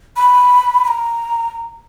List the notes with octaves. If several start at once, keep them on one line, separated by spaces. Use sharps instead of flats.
B5
B5
A#5